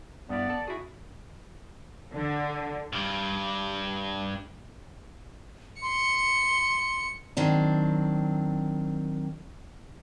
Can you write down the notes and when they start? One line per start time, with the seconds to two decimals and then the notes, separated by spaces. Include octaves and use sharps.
0.29 G2 B3 E4 D5
0.50 A4
0.68 E4 F#4 G#4
2.13 D3
2.93 G2 G3
5.82 C6 C#7
7.37 D#3 F#3 C4 D4